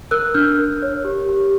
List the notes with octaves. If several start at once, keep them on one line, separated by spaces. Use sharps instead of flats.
A#4 E6 F#6
D4 F6 G6
A#4
C#5
G4
G4